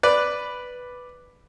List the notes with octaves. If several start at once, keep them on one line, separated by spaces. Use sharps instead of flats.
B4 D5